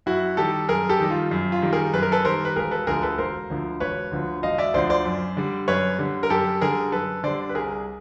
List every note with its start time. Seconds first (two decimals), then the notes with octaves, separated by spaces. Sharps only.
0.06 F#2 E4 F#4
0.37 D#3 G3 G4 A4
0.69 F#2 G#4 A#4
0.89 G4 A4
1.00 D#3 G3
1.11 F4
1.31 F#2
1.52 F4
1.62 D#3 G3
1.73 G#4 A#4
1.93 F#2 B4
2.02 A#4
2.12 A4 B4
2.25 D#3 G3 A#4 C5
2.45 B4
2.56 E1 G#4 A#4
2.71 A4 B4
2.87 D2 D3 F3 G#4 A#4
3.02 A4 B4
3.18 E1 A#4 C5
3.50 D2 D3 F3
3.80 E1 B4 C#5
4.12 D2 D3 F3
4.43 E1 D#5 F5
4.58 D5 E5
4.74 D2 D3 F3 C5 D5
4.90 C5 D5
5.05 F#2
5.37 D3 G3
5.68 F#2 B4 C#5
5.98 D3 G3
6.23 A#4
6.30 F#2 G4 A4
6.61 D3 G3 G#4 A#4
6.92 F#2 A4 B4
7.24 D3 G3 C5 D5
7.49 B4
7.55 C2 G#4 A#4